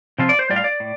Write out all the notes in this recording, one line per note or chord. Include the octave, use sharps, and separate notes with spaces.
C3 F3 C4 F4
D5
C5
A2 G3 F4 D5
F5
D5
A2